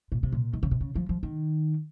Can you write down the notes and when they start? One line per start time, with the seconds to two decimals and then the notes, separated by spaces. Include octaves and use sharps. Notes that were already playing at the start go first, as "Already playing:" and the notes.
0.12 A#2
0.23 C3
0.32 A#2
0.53 D#3
0.63 C#3
0.71 C3
0.81 C#3
0.95 F3
1.09 F3
1.23 D#3